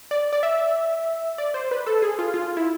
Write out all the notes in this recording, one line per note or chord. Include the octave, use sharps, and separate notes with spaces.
D5
D5
E5
D5
C5
B4
A4
G#4
F4
F4
E4